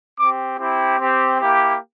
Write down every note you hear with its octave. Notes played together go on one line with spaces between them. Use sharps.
C4 G4 D6
C4 E4 G4
C4 G4
A#3 E4 G4